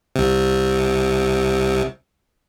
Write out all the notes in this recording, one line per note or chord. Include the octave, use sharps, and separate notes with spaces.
C2 C3